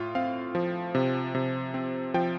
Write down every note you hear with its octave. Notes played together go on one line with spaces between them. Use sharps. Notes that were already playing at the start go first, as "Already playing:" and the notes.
Already playing: A2 F4
C4 F5
F3
C3
C3
C4
F3 G5